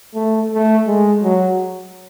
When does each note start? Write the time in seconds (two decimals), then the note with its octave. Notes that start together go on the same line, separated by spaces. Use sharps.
0.14 A3
0.52 A3
0.87 G#3
1.23 F#3